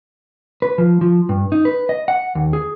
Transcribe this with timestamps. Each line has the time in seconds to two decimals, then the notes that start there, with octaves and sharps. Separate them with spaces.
0.62 B4
0.78 F3
1.01 F3
1.29 G2
1.52 D#4
1.65 B4
1.89 D#5
2.08 F#5
2.35 D#2
2.53 G#4